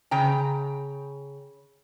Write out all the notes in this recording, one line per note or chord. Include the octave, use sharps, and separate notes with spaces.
C#3 G5 A#5